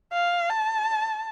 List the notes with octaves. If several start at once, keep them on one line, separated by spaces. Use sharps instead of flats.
F5
A5